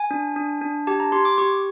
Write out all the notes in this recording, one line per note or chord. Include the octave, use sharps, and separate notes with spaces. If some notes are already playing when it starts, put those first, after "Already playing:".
Already playing: G#5
D4
D4
D4
G4 A5
A#5
G4 C6
D6
G4 C#6